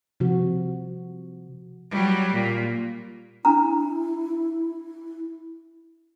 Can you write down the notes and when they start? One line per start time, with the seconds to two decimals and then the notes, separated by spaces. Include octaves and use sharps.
0.20 C3 F3 F#4
1.91 F#3 G3
2.34 A#2
3.45 D4 E4 A#5